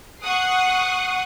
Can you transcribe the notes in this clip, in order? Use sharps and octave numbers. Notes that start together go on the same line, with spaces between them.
F#5 C#6 D#6 F#6 C7